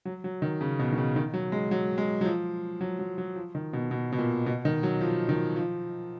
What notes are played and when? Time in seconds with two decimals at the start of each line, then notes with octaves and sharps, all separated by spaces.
0.05 F#3
0.24 F#3
0.42 D#3
0.61 C#3
0.79 B2
0.92 D#3
0.98 C#3
1.16 D#3
1.34 F#3
1.52 G#3
1.71 F#3
1.98 G#3
2.21 F#3
2.25 F3
2.81 F#3
2.99 F#3
3.18 F#3
3.36 F3
3.55 D#3
3.73 B2
3.91 B2
4.12 B2
4.18 A#2
4.46 B2
4.65 D#3
4.83 F#3
5.01 F3
5.29 D#3
5.56 F3